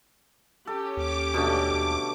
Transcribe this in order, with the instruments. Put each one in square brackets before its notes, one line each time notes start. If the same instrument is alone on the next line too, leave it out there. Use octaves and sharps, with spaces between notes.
[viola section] C#4 G4 [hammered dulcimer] A4
[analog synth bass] D#2 [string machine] D6
[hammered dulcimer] B2 D3 A3
[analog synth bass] D#2